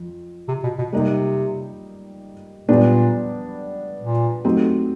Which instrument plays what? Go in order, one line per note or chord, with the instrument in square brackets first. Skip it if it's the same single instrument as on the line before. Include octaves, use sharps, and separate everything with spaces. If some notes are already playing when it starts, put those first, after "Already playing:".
Already playing: [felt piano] F2
[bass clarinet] C3
B2
B2
[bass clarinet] C3 [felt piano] G3 A#3 D#4 G4
[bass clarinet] A#2 [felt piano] G3 B3 D4 G4
[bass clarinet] A#2
[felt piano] F#3 A3 C4 D#4 G4